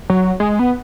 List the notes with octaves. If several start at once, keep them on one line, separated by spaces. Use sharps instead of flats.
F#3
G#3
B3